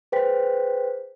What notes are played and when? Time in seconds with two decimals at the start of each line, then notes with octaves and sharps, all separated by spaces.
0.12 G#4 B4 C5 G5 B6